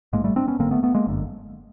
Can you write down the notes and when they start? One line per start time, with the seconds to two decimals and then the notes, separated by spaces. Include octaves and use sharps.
0.13 A1 G#2 G#3 A#3
0.24 G3 A3
0.36 C4 D4
0.47 B3 C#4
0.59 G#1 F#2 D3 A#3 C4
0.71 A3 B3
0.83 A3 B3
0.95 G#3 A#3
1.07 G1 F#2 D3